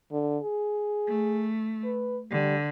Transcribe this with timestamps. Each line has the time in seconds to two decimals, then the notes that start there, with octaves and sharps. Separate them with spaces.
0.12 D3
0.43 G#4
1.08 A3
1.84 B4
2.31 D3 G3